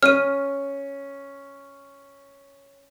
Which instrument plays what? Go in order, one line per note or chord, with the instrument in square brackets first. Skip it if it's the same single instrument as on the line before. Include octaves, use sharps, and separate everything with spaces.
[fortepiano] C#4 [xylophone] F6 D#7